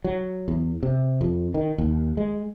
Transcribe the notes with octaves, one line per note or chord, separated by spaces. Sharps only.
F#3
E2
C3
F2
D#3
D#2
G#3